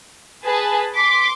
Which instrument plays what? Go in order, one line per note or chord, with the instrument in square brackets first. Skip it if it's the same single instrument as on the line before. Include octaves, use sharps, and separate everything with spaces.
[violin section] G#4 B4 A5
[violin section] C6 D6 [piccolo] B6